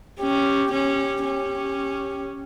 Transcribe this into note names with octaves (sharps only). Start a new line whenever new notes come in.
C#4 G4
C#4 G4
C#4